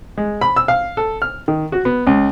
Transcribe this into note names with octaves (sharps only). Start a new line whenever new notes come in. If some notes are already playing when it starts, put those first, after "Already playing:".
G#3
B5
E6
F5
A4
F6
D#3
F#4
B3
C#2